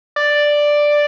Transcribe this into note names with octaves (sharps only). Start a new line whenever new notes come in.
D5